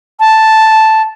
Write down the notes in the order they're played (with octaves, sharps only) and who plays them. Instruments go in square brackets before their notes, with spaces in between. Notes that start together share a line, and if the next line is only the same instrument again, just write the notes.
[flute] A5